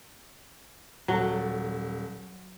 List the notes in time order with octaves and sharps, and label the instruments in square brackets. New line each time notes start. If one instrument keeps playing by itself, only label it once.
[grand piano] D#1 A4 A5 [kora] F#3